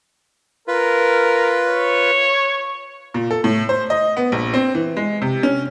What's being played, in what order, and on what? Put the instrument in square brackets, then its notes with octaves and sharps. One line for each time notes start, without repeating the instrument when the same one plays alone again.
[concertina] F4 B4 [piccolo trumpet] A#4
[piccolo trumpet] C#5
[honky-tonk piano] A#2
A4
A2
C5
D#5
B3
A#1
C4
E3
G#3
C3
C#4